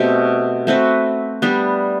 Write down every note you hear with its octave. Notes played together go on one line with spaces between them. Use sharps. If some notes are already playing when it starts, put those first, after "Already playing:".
Already playing: B2 A3 C4 G4
A3 C4 F#4 B4
G3 B3 D4